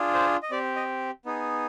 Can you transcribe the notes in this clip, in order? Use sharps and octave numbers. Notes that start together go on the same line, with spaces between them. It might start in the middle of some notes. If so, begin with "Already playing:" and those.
Already playing: D4 F4 G#4
C5
D#5
C4 G4 D5
D#5
B3 D#4 G#4